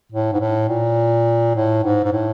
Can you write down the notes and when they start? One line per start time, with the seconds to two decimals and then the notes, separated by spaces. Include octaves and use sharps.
0.12 A2
0.33 G#2
0.40 A2
0.69 A#2
1.56 A2
1.84 G#2
2.04 G#2
2.13 A2